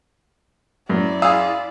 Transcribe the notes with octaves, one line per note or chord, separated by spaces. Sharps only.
F#2 E4 D5
F4 G#4 F5 D#6 E6